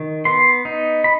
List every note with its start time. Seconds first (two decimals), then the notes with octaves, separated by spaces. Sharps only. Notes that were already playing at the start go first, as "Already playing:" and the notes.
Already playing: D#3
0.25 B3 C6
0.65 D#4
1.04 B5